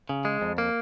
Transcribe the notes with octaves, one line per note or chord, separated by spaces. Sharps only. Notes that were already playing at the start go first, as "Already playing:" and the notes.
C#3
G#3
F2
A#3